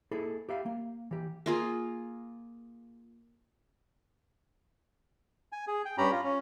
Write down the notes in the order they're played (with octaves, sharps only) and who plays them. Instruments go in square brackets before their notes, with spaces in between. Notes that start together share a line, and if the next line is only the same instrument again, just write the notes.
[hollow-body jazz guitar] A#3 E4 G#4 A4
G4 E5 F5
A#3
E3 G4
[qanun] A#3 F4 G#4
[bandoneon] G#5
G#4
G5
G2 C#4 G4 A#5 B5
F4
C#4